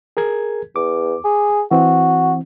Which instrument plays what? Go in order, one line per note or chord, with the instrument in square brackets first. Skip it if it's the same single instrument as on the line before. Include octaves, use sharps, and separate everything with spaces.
[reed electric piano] G#4 A#4 G#6
[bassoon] E2 [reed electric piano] D6
[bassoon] G#4
[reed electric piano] E3 C4 [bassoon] F#4